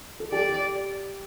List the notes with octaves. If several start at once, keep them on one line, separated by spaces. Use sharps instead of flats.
A4
G4 D5